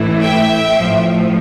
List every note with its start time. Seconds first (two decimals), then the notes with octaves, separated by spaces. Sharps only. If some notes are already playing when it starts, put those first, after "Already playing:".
Already playing: A1 A2 E3 A3 E4
0.21 E5 G5
0.77 A1 A2 F3